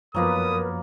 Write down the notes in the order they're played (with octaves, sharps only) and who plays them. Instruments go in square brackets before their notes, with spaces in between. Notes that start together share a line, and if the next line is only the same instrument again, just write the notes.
[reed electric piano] F#2 F3 [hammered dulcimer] F#3 A#3 B3 [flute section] A#4 B4 [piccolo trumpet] D#6